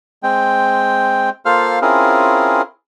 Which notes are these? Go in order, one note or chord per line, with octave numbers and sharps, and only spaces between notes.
G#3 C4 G5
A#3 F4 A4 C5 F5 F6
C4 C#4 E4 F4 G#4 A#4